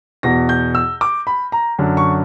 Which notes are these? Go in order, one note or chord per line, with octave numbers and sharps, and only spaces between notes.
E2 B2 A#6
G6
E6
D6
B5
A#5
F#2 D3
C#6